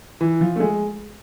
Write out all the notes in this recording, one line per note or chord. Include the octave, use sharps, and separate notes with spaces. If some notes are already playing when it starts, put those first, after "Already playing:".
E3
F3
A3
G#3